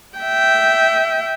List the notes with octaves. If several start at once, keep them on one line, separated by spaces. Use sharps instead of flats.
E5 G5